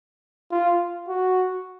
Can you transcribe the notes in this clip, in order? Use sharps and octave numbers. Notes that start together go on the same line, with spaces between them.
F4
F#4